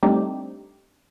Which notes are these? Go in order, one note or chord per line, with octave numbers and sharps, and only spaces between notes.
G3 A3 C4 D4 D#4 G4